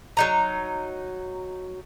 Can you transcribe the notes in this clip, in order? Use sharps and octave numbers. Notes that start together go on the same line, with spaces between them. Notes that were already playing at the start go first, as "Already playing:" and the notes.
F#3 D#4 A#5